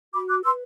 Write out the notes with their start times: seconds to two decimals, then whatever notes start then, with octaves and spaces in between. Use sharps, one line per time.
0.13 F#4 B5 D6
0.29 D6 F#6
0.44 B4 C6 E6